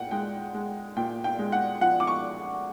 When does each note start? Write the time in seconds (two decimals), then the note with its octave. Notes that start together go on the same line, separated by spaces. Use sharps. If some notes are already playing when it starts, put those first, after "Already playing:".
Already playing: A#2 F#5 G5
0.11 G#3 G5
0.54 G#3
0.96 A#2 G5
1.24 G5
1.39 G#3
1.52 F#5
1.81 F3 F#5
2.00 D6
2.07 C#6